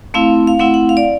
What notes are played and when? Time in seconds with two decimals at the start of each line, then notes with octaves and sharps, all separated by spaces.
0.14 A3 C4 E4 F5
0.47 F5
0.59 A3 C4 E4 F#5
0.74 F#5
0.89 F5
0.97 D5